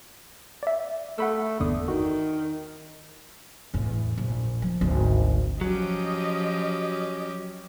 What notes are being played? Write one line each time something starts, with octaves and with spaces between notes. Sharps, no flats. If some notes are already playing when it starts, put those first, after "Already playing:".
D5 E5
A3 F#5 B5 E6
G1 E2 D3 D#6
D#3 F#4
E2 A2
A#1
F3
G#1 D2
F3 F#3 C#4 G4 D#5